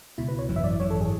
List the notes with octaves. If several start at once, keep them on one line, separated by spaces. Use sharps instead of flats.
C#2 B2 E4
B4
C#5
G#1 F#2 E3
E5
D5
G#1 F#2 E3 C#5
A4
G#4